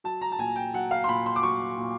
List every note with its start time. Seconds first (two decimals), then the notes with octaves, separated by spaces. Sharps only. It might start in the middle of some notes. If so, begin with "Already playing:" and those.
0.04 F#3 A5
0.21 A#5
0.32 A5
0.39 A#2 G#5
0.56 G5
0.73 F#3 F#5
0.91 F5
1.04 C6
1.08 A#2 B5
1.26 C6
1.36 D6
1.43 F#3 C#6
1.77 A#2